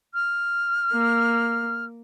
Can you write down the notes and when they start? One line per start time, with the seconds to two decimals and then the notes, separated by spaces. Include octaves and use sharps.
0.14 F6
0.92 A#3